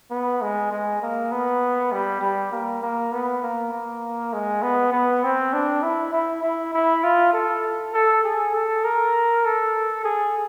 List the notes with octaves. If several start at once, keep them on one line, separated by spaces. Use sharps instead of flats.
B3
G#3
G#3
A#3
B3
G3
G3
A#3
A#3
B3
A#3
A#3
G#3
B3
B3
C4
D4
E4
E4
E4
E4
F4
A4
A4
G#4
A4
A#4
A4
G#4